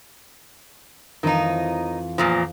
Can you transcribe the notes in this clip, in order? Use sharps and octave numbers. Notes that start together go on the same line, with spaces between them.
F2 D#3 E3 D#4
E2 A#2 F3